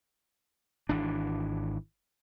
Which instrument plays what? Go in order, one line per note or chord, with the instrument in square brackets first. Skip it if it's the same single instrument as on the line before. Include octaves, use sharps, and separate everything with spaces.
[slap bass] G#1 E3 D4